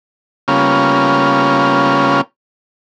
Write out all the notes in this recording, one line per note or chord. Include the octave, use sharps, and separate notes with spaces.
C#3 G3 A#3 B3 C#4 F4